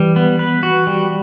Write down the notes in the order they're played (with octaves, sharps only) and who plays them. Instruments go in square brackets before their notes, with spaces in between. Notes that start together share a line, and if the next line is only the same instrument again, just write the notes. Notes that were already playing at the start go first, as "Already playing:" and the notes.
Already playing: [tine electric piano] E3 [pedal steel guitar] G3
[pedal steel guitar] B3
B4
F#4
G3